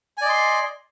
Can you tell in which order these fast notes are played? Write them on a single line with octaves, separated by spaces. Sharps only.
G#5 D5 D#5 C6